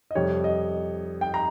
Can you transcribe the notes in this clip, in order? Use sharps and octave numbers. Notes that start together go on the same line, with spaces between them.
D#5
F2 C3 G3 C#5
D#5
G5
A#5